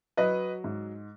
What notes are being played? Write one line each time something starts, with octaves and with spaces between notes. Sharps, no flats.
F#3 B4 D#5
G#2